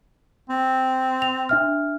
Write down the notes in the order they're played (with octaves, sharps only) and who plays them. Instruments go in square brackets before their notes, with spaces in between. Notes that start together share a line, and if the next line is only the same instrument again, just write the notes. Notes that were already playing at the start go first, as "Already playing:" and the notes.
[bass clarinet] C4
[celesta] F7
D4 E5 F6